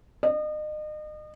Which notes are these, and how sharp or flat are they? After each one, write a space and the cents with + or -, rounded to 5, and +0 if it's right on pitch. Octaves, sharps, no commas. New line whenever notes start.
D#5 -35